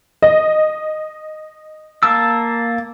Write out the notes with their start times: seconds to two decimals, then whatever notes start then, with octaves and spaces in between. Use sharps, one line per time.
0.22 D#5
2.03 A#3 A5 E6